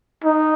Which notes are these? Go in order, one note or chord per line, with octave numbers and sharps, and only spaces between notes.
D#4